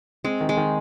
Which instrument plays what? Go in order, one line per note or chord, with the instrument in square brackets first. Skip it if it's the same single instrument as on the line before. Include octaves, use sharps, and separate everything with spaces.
[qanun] G#3 [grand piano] C4
[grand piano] D#3
[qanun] G#3
[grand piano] D#3